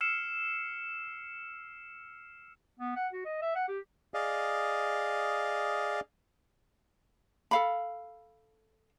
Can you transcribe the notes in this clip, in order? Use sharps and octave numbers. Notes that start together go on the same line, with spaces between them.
E6 F6 C7 C#7 E7
B3
F#5
F#4
D#5
E5
F#5
G4
G#4 D5 D#5 F5
A4 F5 B5